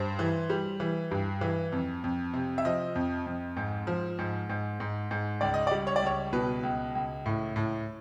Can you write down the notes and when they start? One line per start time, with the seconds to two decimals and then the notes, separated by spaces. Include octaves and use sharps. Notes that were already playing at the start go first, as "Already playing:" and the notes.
Already playing: G2 C5
0.19 E3
0.50 G3
0.80 E3
1.11 G2
1.41 E3
1.72 F2
2.04 F2
2.33 C3
2.58 E5
2.65 F3 D#5
2.95 F2
3.27 F2
3.57 G#2
3.87 F3
4.19 G#2
4.49 G#2
4.80 G#2
5.11 G#2
5.41 C#2 D5
5.54 D#5
5.67 D5
5.71 G3
5.87 C#5
5.96 D5
6.02 C#2 C#5
6.33 B2 B4
6.63 C#2
6.95 C#2
7.26 A2
7.56 A2